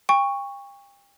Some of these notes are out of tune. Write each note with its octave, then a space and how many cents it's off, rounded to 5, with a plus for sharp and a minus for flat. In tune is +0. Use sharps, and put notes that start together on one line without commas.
G5 +40 C#6 +0